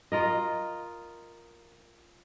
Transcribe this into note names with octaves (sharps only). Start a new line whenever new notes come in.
F4 A#4 D#5